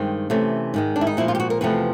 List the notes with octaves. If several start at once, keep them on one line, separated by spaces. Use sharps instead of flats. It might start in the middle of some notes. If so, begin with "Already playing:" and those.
Already playing: G2 D#3 G#3 C4
C3 E3 A3 C#4
G#2 D#3 G#3
D4
E4
D#4
A#2 F3 G#3 E4
F4
G4
F#4
A#4
E2 C3 F3 A3 B4